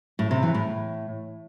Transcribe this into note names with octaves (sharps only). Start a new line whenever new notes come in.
A2
C3
E3
A2